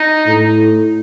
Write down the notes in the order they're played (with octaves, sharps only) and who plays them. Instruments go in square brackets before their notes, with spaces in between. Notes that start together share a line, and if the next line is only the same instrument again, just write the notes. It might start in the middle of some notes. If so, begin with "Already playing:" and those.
Already playing: [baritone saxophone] D#4
[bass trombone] A2